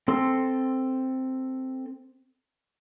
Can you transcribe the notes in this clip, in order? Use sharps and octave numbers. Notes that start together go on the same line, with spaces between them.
C4 A4 C6